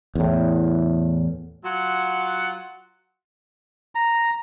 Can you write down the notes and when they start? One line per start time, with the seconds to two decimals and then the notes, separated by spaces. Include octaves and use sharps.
0.15 E2 A2
1.65 F#3 F4 F#5
3.95 A#5